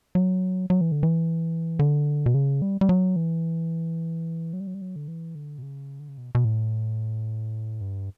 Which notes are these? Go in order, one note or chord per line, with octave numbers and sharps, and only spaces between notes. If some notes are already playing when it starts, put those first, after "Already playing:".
F#3
F#3
E3
D3
E3
D3
B2
C#3
G3
G3
F#3
E3
F#3
G3
F#3
G3
F#3
D3
E3
D3
B2
C#3
D3
C#3
B2
B2
A2
G2